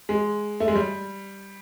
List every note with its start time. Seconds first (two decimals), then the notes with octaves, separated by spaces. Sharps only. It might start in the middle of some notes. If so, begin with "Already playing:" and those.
0.09 G#3
0.60 A3
0.68 G#3
0.75 G3